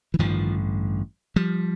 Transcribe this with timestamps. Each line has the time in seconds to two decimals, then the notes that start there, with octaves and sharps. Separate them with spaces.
0.14 E3
0.19 A1 G2 D3 D#3 F3
1.36 F3 G3